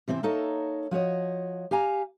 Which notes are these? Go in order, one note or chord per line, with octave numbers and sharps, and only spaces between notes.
C3 E3 C4 C#5 E5
A#3 D#4 A4 C#5 E5
F3 F#4 C#5 D#5
G4 F5 G#5 A#5